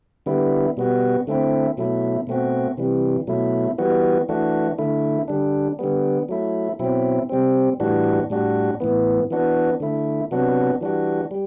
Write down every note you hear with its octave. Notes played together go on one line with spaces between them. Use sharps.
D3 G3 B3 E4
B2 G3 B3 F#4
D3 A3 C4 E4
B2 F#3 A3 E4
B2 A3 C4 F#4
C3 E3 G3
B2 F#3 A3 E4
E3 G3 B3 F#4
E3 A3 D4 F#4
D3 A3 E4
D3 G3 D4
D3 G3 B3
F#3 A3 E4
B2 F#3 C4 E4
C3 G3 C4
A2 E3 G3 D4 F#4
A2 G3 D4 F#4
A2 E3 B3
E3 B3 D4 F#4
D3 A3 E4
C3 F#3 B3 D4 F#4
E3 G3 D4 F#4
G3